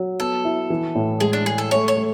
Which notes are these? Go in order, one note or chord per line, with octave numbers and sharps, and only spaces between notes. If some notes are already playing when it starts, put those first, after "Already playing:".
Already playing: F#3
B3 A4
E4
E3
A2
G#3 G#4
D4
G#3 G#4
A4
A3 C#5
C#5
A3